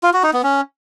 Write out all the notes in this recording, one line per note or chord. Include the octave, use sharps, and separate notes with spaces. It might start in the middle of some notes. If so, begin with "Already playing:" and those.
F4
F#4
D#4
B3
C#4